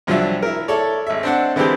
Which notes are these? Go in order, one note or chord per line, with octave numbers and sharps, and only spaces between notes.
C2 F3 F#3 D4 E5
E4 A#4
E4 A4 C#5 D5
G#1 E5
C4 D4 F#5
D3 E3 G#3 C4 G4